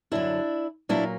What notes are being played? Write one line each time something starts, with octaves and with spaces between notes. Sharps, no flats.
F#2 D3 F#3 D4 E4
A#2 F#3 A#3 D4 E4